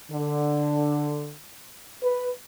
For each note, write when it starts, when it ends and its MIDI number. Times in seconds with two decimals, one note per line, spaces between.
0.11 1.33 50
2.03 2.29 71